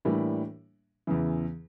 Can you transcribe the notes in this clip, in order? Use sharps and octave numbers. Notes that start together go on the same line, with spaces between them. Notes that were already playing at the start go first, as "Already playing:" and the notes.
A2 E3 G3 A#3 D4
E2 C#3 E3